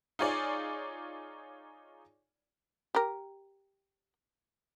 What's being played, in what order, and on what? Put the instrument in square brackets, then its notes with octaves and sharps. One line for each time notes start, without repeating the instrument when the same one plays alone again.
[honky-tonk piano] D#4 F4 G#4 C#5 D5
[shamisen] G4 A#4